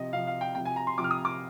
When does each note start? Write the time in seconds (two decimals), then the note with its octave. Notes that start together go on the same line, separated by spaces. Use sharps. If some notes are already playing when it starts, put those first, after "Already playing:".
Already playing: C3 F3 D#5
0.13 C3 F3 F5
0.27 F5
0.41 G5
0.55 C3 F3 G5
0.65 G#5
0.76 A#5
0.87 C6
0.98 C3 F3 D6
1.04 F6
1.11 D#6
1.25 D6